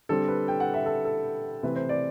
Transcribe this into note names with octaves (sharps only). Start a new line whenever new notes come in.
D3 G3 C4 A4
B4
G5
F#5
E5
A4
A4
C3 E3 A3 C4 E4 B4
C5
D5